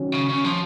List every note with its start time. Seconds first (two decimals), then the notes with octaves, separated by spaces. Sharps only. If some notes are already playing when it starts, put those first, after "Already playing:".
Already playing: D#3 F#3 C#4
0.14 C#3
0.29 C#3
0.44 F3